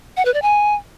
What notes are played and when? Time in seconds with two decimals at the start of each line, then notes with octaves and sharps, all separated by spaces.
0.17 F#5
0.25 B4
0.34 D5
0.42 G#5